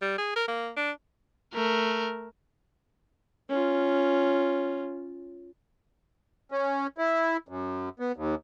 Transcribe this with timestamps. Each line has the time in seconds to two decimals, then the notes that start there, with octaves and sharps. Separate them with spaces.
0.02 G3
0.18 G#4
0.36 A#4
0.48 A#3
0.76 D4
1.54 A3 A#4
3.50 C#4 F4
6.52 C#4
6.98 E4
7.49 F#2
8.00 B3
8.16 D#2